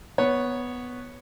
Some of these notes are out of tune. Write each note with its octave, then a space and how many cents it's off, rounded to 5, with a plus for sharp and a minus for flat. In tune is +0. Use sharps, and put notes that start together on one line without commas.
B3 +0 C#5 +0